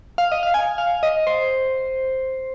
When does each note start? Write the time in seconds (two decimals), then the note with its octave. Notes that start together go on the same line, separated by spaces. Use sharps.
0.18 F5
0.32 D#5
0.43 F5
0.54 G#5
0.78 F5
1.03 D#5
1.27 C5